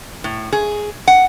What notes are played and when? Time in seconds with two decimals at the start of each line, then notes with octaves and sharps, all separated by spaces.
0.24 A2
0.52 G#4
1.08 F#5